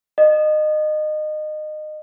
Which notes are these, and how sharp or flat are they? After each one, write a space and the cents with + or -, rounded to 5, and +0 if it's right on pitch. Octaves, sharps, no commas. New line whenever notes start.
D#5 -25